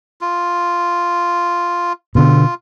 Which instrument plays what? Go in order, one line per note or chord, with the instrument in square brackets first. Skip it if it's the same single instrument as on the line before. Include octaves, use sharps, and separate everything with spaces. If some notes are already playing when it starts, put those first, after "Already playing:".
[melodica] F4
[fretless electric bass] B2 D3 B3 [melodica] F4